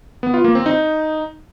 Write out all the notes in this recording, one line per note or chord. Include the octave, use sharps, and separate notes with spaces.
B3
F4
A#3
C4
D#4